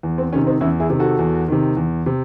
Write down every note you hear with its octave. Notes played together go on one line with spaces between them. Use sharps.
E2
C4
C3 D#3 C#4
C4 D#4
E2 C#4 E4
E4 G#4
C3 D#3
F#4 A4
E2
C3 D#3
E2
C3